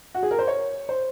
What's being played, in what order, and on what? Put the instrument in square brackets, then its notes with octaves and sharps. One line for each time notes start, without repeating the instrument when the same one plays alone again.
[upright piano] F#4
G#4
A#4
C5
C#5
C5